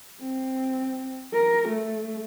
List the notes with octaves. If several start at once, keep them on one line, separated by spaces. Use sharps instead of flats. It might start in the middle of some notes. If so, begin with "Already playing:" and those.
C4
A#4
A3